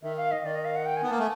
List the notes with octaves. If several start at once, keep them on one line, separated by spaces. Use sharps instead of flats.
D#3 E5
F5
D#5
D#3 D5
D#5
F5
F#5
G5
G#5
B3
A#3 A5
A3 G#5